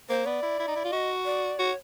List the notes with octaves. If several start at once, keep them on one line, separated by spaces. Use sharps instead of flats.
A#3 C5
B3 D5
E4
E4
D#4
E4
F4
F#4 D#5
D5
F#4 C#5